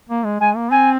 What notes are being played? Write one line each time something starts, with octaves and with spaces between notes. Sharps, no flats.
A#3
G#3
G#3 G#5
A#3
C4 G#5